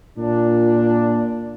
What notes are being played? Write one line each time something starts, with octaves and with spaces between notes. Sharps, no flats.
A#2 D4